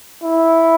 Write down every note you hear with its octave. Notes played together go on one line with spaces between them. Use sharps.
E4